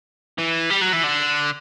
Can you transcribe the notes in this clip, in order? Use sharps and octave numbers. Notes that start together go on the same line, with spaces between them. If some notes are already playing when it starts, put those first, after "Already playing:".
E3
G3
F#3
E3
D3